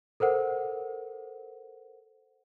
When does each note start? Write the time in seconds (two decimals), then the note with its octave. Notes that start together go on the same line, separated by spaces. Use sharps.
0.20 A4 A#4 C5 F#5